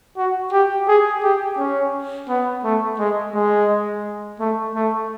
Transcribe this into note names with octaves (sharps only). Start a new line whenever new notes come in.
F#4
G4
G#4
G4
C#4
B3
A3
G#3
G#3
A3
A3